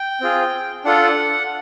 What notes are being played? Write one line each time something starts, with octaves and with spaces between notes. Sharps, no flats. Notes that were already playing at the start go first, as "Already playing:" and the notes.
Already playing: G5
C4 F4 G#4
D4 F4 A4 F#5